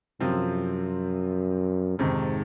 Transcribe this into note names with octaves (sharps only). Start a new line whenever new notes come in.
F#2 C3 F3 C4 F4
F2 G#2 C3 D#3